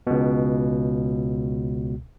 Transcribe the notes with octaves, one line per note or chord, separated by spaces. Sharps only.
C#2 B2